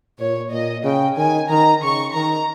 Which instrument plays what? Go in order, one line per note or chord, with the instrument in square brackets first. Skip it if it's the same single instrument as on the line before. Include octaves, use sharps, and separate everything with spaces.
[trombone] A#2 [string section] C#5
[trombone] A#2 [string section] D#5
[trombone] C#3 [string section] G5
[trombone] D#3 [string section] G#5
[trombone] D#3 [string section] A#5
[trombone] C#3 [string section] C#6
[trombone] D#3 [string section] A#5